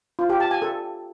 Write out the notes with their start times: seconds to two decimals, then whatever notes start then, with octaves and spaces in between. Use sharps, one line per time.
0.19 F4
0.30 G4
0.40 A5
0.51 G#5
0.62 A4